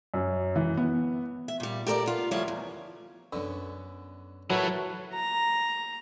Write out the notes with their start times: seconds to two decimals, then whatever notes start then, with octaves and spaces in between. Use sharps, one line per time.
0.14 F#2
0.56 E3
0.77 B3
1.48 E5
1.60 A#2 G3
1.86 G4 A4 A#4 C5 D5
2.06 B3 F4
2.31 D2 F3 G3 A#3 E4 C#5
2.48 E2
3.33 F#2 D3 B3
4.50 A2 F#3 A3 E4 A#4 B4 C#5
5.14 A#5